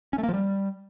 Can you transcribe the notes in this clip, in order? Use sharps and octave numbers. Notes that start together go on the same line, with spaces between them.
C#4
A3
A#3
F3
G3